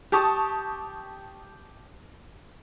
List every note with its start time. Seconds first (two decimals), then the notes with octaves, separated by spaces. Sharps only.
0.12 G4 A5 C#6 D#6